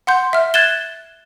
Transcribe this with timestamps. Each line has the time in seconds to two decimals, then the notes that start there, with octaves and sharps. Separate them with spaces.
0.07 F#5 C6 G6
0.33 E5 F6
0.54 F#6 G#6 A6 E7 G7